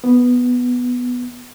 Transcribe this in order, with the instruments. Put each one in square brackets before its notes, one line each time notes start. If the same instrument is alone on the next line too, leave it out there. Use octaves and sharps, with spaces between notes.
[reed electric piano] B3